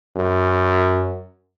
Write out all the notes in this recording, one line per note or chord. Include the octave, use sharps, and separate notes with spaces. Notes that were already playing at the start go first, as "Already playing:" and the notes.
F#2